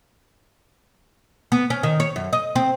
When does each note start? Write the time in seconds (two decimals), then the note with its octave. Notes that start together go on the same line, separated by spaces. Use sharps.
1.52 B3
1.70 C#4
1.83 D#3
2.00 C#5
2.16 F#2
2.33 D#5
2.56 C4